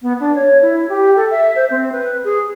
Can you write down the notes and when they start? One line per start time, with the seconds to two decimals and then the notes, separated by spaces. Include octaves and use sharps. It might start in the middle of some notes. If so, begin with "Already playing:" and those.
0.02 B3
0.20 D4
0.35 C#5
0.62 E4
0.89 G4
1.16 A4
1.31 E5
1.56 C5
1.70 C4
1.92 B4
2.24 G#4